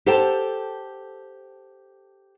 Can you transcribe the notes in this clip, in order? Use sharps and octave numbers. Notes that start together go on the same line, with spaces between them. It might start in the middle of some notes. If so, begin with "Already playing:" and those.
G4 A4 C5 F#5 G5 A5